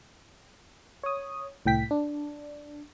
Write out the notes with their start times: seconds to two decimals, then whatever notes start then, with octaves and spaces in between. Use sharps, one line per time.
1.04 C#5 D#6
1.66 C2 A2 G5 B6
1.91 D4